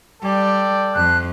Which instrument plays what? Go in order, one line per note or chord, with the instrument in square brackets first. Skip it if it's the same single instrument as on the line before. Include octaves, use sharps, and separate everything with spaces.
[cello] G3 [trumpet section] A4 D5 G5
[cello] F2 [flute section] A5 F#6